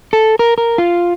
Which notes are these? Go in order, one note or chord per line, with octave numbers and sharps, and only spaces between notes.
A4
A#4
A#4
F4